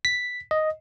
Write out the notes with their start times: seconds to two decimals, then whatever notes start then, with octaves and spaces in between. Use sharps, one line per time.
0.05 B6
0.51 D#5